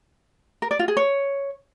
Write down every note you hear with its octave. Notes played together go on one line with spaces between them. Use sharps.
A#4
D5
F4
G#4
C#5